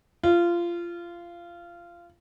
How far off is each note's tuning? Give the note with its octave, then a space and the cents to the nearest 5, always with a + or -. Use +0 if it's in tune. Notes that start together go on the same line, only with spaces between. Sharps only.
F4 -20